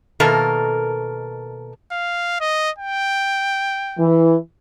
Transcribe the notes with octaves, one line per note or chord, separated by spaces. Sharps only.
B2 D#3 A#3 A4 A#4
F5
D#5
G5
E3